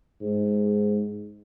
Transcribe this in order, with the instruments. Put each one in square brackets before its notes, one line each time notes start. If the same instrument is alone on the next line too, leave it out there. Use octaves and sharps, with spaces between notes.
[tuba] G#2